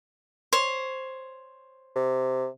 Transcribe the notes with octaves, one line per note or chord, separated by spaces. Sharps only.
C5 C#5
C3